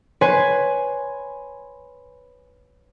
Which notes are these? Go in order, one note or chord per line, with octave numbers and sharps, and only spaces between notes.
B4 C#5 G#5 C6